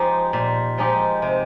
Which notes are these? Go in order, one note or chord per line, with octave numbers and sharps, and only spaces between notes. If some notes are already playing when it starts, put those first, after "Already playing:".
Already playing: F3 G#3 D#4 G4
A#2
F3 G#3 D#4 G4
C3